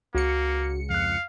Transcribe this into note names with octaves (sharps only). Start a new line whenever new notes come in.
C#2 A#3 F#4 C#7
F2 F5 F#6